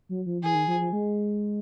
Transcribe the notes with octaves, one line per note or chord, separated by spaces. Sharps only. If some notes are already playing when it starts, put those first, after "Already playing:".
F#3
F3
E3 G#4
D#3
F3
F3
G#3